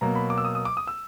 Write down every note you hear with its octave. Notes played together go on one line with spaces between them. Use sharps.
B2 F#3 A#3 A#5
B5
D6
E6
D#6
D#6
D6
D#6
E6